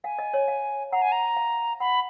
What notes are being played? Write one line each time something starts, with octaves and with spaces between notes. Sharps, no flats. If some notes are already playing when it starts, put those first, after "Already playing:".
F5 G#5
D#5
C#5
F5
F#5 A#5
G#5
A#5
F5
F#5 B5